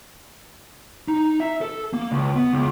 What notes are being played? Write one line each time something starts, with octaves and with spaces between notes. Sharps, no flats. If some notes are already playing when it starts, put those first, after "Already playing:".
D#4
E5
A4
A#3
C#2
B3
C#2